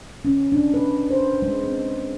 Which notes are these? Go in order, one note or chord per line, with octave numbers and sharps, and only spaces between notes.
C#4
D4
B4
C5
G#3
C4